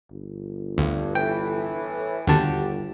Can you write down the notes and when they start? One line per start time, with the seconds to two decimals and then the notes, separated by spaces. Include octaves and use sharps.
0.11 G1
0.78 D2 G2
1.15 A2 E3 G5
2.27 G1 D#2 D3 F#4 G4 A5